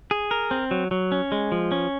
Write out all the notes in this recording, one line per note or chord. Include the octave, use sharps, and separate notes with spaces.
G#4
A#4
C4
F#3
F#3
C#4
G#3
F3
C#4